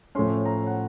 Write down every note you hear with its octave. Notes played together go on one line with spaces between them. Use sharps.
A2 F3 A3 C#4 C6
A#5
F#5